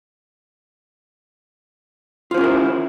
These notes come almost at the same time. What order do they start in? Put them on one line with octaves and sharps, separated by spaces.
F4 C5 C#4 A#4 E4